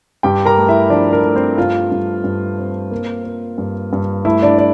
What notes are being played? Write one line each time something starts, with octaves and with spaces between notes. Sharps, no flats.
G2 G4 G5
A#4 A#5
A3
E4 E5
F3 D4 D5
A#4
A3
C4 C5
G2 F4 F5
G2
G2
C4
A#3
A#3
G2
G2
A3 E4 E5
D4 D5
D5